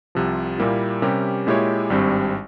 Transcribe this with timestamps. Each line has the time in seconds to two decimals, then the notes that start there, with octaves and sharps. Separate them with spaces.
0.15 C2 C3 F3
0.58 A#2 G3 A#3 E4
1.02 C3 G3 C#4 G4 A#4
1.47 A#2 G#3 E4 G4 C#5
1.90 G#1 G2 G3 C4